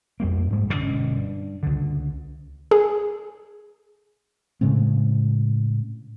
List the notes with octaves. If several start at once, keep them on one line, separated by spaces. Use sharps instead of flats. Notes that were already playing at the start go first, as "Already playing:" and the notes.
F2 G3 A#3
G#2 G#3
D1 A1 C#3
G1 B2 G#3 C#4
G2
C#2 D3
G#4
A2 C#3 G#3 C4